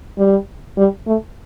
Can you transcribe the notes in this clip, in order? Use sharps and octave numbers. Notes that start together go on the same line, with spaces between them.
G3
G3
A3